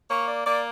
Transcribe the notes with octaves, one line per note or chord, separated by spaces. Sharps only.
A#3 C#5
D5
A#3 D5